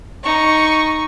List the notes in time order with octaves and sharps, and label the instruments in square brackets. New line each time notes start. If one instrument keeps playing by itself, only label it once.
[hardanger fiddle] D#4 C#6